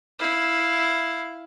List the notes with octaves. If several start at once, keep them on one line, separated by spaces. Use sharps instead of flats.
E4 F5